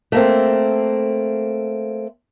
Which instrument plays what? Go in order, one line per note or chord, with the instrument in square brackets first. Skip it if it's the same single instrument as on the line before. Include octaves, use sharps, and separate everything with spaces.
[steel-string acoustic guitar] A3 A#3 C4